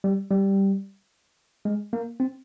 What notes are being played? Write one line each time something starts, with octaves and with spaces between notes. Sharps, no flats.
G3
G3
G#3
A#3
C4